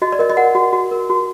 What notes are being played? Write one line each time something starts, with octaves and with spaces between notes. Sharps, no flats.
F#4 D#5
D5
A#4 D#5
D#5
A#4 F#5
F#4
F#4
A#4
F#4